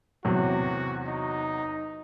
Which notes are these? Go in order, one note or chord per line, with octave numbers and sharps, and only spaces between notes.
E2 C3 F#3 F#4
D#4